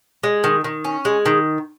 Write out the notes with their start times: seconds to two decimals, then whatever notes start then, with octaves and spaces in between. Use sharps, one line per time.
0.23 G#3
0.44 D#3
0.64 D#3
0.84 C#4
1.05 G#3
1.26 D#3